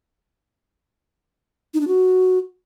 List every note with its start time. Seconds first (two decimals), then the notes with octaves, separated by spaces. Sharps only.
1.74 D#4
1.81 D4
1.87 F#4